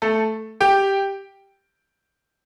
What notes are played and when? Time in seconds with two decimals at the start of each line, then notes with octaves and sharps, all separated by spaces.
0.02 A3 A4
0.61 G4 G5